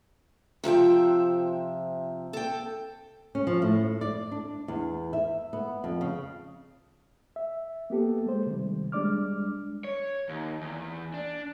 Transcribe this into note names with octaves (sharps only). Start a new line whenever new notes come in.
C3 F3 E5 G5
A4 G5
C#4
F3
A2
D5
D4
E2
E5
B3
F2
C#3
E5
A#3 B3 G4 A4
G#3 C5
C3 D#3 G3
G3 G#3 D4 D5 D6 F6
C#5
D#2
E2
D4